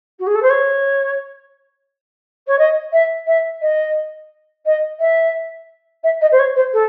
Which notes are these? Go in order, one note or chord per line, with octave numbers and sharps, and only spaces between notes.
F#4
G#4
A4
C5
C#5
C#5
D#5
E5
E5
D#5
D#5
E5
E5
D#5
C5
C#5
C5
A4